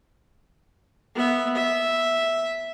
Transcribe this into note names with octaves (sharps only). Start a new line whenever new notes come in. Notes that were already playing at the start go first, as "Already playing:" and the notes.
B3 E5
E5